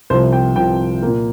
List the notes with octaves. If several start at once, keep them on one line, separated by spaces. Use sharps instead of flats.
C2 C3 F3 C5
G5
C2 C3 F3 G5
A#2 A#3